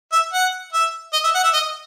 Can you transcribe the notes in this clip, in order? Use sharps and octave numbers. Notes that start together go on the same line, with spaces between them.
E5
F#5
E5
D#5
E5
F#5
E5
D#5